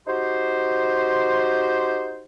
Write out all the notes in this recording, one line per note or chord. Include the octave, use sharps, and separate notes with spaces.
D#4 F#4 G4 C5